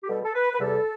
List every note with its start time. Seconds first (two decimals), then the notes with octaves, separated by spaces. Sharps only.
0.03 G4
0.06 B2 G3 A4
0.23 A4
0.34 B4
0.52 B4
0.59 E2 C3 G3 A4